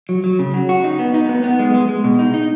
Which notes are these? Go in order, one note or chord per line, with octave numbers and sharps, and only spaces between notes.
F#3
F#3
C#3
F#3
F#4
D#4
B3
D#4
B3
B3
G#3
G#3
G#3
B2
D#4
D#4